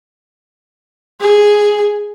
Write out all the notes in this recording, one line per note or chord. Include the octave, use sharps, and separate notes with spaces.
G#4